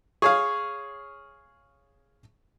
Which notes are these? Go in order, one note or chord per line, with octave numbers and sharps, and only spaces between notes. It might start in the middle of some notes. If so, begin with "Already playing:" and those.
G#4 C#5 F5 C#6